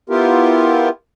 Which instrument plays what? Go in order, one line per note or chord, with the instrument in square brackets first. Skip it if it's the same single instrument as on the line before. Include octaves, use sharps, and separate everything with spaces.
[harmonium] B3 E4 F4 G4 A#4